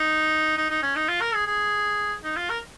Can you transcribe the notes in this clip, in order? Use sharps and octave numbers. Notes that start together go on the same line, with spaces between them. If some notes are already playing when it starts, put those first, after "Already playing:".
Already playing: D#4
D#4
D#4
C#4
D#4
F4
A#4
G#4
G#4
D#4
F4
A#4